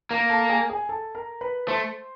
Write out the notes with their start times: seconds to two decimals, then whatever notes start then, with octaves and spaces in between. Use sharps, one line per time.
0.10 A#3 A#4 A#5
0.30 A4 A5
0.49 G#4 G#5
0.69 G#4 G#5
0.89 A4 A5
1.15 A#4 A#5
1.41 B4 B5
1.67 A3 C5 C6